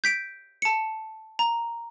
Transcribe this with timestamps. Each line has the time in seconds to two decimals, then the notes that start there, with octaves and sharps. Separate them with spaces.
0.04 G6 B6 D7
0.62 A5 C#7
1.39 A#5